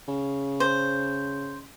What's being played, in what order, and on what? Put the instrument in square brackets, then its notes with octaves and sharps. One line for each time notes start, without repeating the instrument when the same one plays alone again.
[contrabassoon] C#3
[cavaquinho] C5